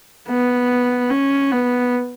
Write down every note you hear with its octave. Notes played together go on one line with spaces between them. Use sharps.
B3
C#4
B3